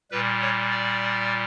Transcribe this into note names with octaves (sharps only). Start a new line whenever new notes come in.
A#2 G3 B4
C#5
D5